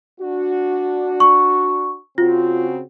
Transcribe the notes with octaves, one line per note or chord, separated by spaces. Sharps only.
D4 F#4
C#6
C#3 C4 F4 F#4